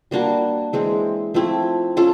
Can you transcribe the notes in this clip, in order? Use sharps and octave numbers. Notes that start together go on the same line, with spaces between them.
G3 A#3 D4 F#4
E3 G#3 C4
F3 A3 C4 E4
C#4 F4 A4